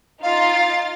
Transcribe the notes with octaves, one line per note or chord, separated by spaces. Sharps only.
D#4 F4 F5 A6